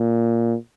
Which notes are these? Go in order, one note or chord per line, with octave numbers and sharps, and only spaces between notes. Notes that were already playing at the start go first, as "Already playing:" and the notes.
Already playing: A#2